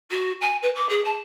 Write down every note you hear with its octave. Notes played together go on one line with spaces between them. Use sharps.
F#4
G#5
B4
D6
G#4
A5